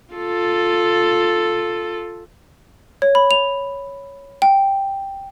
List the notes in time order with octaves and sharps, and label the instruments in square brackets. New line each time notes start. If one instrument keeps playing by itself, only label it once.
[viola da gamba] F4 A4
[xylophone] C#5
B5
F7
G5